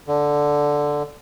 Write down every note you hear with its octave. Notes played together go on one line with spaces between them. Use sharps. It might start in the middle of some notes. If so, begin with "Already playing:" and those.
D3